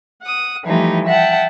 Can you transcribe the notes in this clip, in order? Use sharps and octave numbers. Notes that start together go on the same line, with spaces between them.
F#5 D#6
E3 F3 G3 A3 D#4 G4
E5 F#5 G5 A5